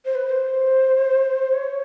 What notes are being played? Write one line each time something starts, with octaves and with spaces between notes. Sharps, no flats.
C5
B4
C5
C#5